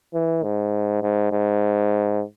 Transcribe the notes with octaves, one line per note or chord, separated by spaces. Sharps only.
E3
G#2
G#2
G#2